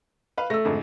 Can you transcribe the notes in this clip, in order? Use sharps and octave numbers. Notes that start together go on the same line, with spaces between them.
B4 F5
A3 E6 A#6
F2 G#2 D3